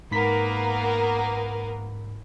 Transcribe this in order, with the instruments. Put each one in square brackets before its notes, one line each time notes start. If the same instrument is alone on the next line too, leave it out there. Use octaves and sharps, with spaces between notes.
[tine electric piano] G#2 B5 B6 [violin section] A#3 B3 A#4